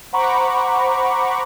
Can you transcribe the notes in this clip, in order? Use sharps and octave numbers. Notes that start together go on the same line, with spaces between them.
C5 F#5 A#5 B5 C#6 D6